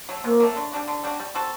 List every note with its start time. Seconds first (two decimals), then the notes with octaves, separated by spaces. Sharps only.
0.09 F#3 A3
0.24 C3 A#3
0.40 F#3 A3
0.56 D3
0.72 G3 D4 F#4
0.88 D3
1.03 G3 D4 F#4
1.20 G3
1.35 C4 F#4 A4